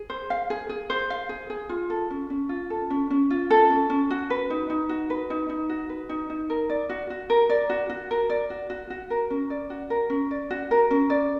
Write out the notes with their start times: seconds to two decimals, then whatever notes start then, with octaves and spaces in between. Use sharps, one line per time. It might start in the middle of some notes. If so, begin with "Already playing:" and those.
Already playing: G#4
0.10 C5
0.30 F5
0.50 G#4
0.69 G#4
0.90 C5
1.10 F5
1.29 G#4
1.50 G#4
1.69 F4
1.90 A4
2.10 C#4
2.30 C#4
2.49 F4
2.70 A4
2.90 C#4
3.10 C#4
3.30 F4
3.50 A4
3.70 C#4
3.90 C#4
4.11 F#4
4.30 B4
4.50 D#4
4.70 D#4
4.89 F#4
5.10 B4
5.30 D#4
5.49 D#4
5.69 F#4
5.89 B4
6.09 D#4
6.30 D#4
6.50 A#4
6.69 D5
6.89 F#4
7.10 F#4
7.30 A#4
7.50 D5
7.70 F#4
7.90 F#4
8.11 A#4
8.30 D5
8.50 F#4
8.70 F#4
8.90 F#4
9.10 A#4
9.30 C#4
9.50 D5
9.70 F#4
9.90 A#4
10.10 C#4
10.31 D5
10.51 F#4
10.71 A#4
10.91 C#4
11.10 D5